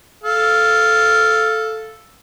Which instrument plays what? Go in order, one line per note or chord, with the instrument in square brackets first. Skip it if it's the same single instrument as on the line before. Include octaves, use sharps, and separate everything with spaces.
[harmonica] A4 F5